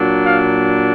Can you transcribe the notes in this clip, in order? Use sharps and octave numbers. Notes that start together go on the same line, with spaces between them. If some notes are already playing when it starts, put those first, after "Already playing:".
Already playing: A#2 F#3 D4
F5